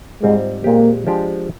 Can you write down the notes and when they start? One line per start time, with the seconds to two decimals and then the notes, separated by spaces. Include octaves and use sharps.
0.22 G#2 G3 G#3 C4 F4
0.64 A#2 G#3 A#3 C4 G4
1.07 F3 G#3 D4 G4